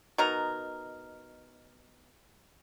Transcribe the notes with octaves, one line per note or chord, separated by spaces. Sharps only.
B2 D#4 A#4